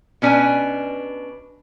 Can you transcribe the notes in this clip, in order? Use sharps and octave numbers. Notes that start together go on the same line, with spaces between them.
B2 C#4 D4 B4 G#5